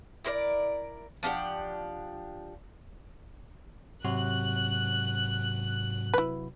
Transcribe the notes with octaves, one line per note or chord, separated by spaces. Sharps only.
E4 A#4 B4 D5
F3 D4 G4 F#5
G#2 C3 F#3 F#4 F#6
E4 B4